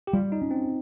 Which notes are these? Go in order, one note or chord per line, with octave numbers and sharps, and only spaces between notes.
G4
G3 F4
D#4
C#4
C4